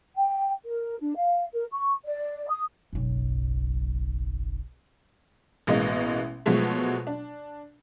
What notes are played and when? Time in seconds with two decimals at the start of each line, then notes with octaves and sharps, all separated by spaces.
0.16 G5
0.66 A#4
1.00 D4
1.16 F5
1.53 A#4
1.72 C#6
2.05 D5
2.49 D#6
2.93 F#1 B1
5.67 A1 B2 G#3 A#3 D#5
6.46 B2 F3 F#3 G#3 A3
7.07 D4